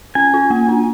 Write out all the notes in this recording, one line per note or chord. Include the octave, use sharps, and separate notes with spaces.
C#4 G#5
F4
A#3
D4